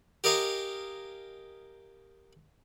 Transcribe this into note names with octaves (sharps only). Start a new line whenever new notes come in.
G4 A#4 D#5 F5 G#5